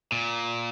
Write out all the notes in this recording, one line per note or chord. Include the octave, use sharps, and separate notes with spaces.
A#2